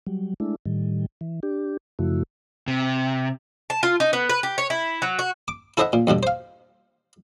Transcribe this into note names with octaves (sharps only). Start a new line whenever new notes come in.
F#3 G3
G#3 A3 D4 E4
A2 D#3 G3
E3
D4 G4
F#2 C#3 F3 A3 E4 F#4
C3
A5
F4
D#4
B3
B4
G4
C#5
E4
F#3
F#4
D6
E4 A4 C5 D#5 E5 F#5
A#2
E2 G2 B2 D3
C5 F5